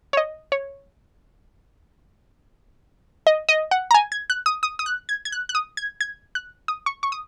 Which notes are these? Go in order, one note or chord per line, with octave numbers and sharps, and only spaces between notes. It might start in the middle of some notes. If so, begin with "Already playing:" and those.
C#5
D#5
C#5
D#5
D#5
F#5
A#5
G#5
G#6
F#6
D#6
D#6
D#6
F#6
G#6
G#6
F#6
F#6
D#6
G#6
G#6
F#6
D#6
C#6
C#6
D#6